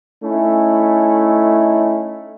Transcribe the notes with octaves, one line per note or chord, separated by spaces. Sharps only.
A3 C#4 D#4 E4